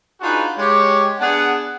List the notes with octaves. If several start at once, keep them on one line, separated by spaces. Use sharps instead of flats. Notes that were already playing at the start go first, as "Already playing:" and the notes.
D4 D#4 F4 F#4 G#4 B4
G#3 G4 C#5
B3 D4 G#4 F#5